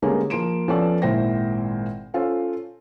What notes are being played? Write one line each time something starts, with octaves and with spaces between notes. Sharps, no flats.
D3 G3 G#3 A#3 B3 C#4
F3 A#3 C6 D7 E7
F3 B3 C#4 A4 B4 D5
G#1 A#2 E4 C5 G5 A#6
C#4 F4 A4 C5